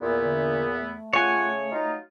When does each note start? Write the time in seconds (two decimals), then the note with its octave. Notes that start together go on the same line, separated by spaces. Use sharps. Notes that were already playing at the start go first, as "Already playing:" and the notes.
0.02 E2 A#2 B3 E4
0.21 D3
0.80 A3
1.13 C#3 F4 C#5 F#5 G#5
1.72 F#3 D#4 F4